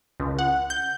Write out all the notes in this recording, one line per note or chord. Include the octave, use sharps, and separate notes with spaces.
C#2
F#5
G6